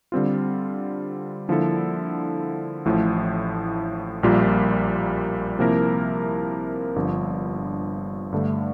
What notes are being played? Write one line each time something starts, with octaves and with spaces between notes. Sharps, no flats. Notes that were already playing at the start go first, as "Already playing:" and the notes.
D3 G3 C4 F4
D3 F3 A#3 E4 A4
A1 A2 F3
A#1 A#2 G3 A#3 F4
C3 F3 A#3 E4 A#4
G1 G2 F3
G2 D3 A3